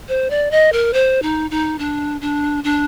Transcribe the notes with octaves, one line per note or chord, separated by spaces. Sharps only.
C5
D5
D#5
A#4
C5
D#4
D#4
D4
D4
D4